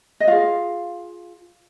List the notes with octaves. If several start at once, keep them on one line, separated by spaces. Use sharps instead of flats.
D#5
F4 G#4 F5